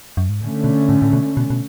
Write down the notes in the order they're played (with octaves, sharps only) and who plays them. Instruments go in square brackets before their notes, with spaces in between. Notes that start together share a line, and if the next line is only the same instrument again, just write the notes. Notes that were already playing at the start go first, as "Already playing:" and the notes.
[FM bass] F#2
G#2
[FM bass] A2 [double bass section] D3 A3 C#4
[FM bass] B2
A2
A2
B2
B2
B2